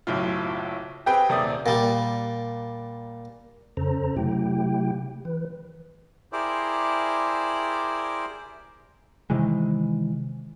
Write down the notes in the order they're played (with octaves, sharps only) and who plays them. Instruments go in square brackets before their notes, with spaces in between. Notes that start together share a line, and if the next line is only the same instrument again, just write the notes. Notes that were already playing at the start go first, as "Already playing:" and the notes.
[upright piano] F#1 B1 A2 F4
C4 G4 G#4 B4 G5
D#1 C3 A#3 D5 D#6
[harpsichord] A#2 G3
[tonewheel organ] F2 C#3 C#4 A4 C5 A#5
C3 F#3 A3 E4 G4 G5
E3 B4
[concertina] E4 G4 G#4 A#4 C5 D5
[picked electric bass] C3 D#3 E3 G#3